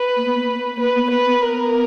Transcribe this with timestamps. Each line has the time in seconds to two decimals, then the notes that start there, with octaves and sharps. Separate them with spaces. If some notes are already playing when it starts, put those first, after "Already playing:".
Already playing: B4
0.16 A#3
0.26 B3
0.36 A#3
0.80 A#3 B4
0.96 B3
1.11 B4
1.26 B3
1.42 A#4